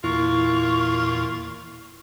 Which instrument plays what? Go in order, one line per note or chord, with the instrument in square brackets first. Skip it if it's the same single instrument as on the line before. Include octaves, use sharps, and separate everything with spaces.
[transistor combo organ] E2 A#2 [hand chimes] E4 [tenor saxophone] F4 [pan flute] C#6